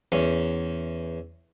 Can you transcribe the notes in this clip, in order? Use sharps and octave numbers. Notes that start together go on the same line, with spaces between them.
E2 C#4